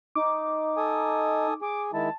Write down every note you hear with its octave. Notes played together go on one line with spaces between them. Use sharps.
D#4 D6
A4 G#5 D#6
G#4 D6
D#3 G#3 E4 A5